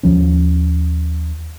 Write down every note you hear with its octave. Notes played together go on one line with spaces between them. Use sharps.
D#2 F3 C#4